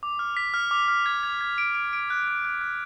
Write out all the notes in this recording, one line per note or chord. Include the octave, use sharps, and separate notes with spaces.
D6
F6
B6
F6
D6
F6
G#6
G#6
G#6
D7
D7
D7
F#6
F#6
F#6
F#6